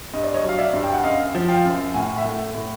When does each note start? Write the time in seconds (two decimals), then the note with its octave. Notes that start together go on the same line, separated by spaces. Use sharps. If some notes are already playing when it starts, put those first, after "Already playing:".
0.14 G2 D#5
0.24 D5
0.34 C#5 D#5
0.43 F#3
0.49 F5
0.58 D5 E5
0.73 G2
0.84 G5
0.94 F#5
1.03 F#2 D#5 F5
1.35 F3
1.49 F5 G5
1.65 F#2
1.94 A2 F#5 G#5
2.18 E5 F#5
2.25 A3
2.54 A2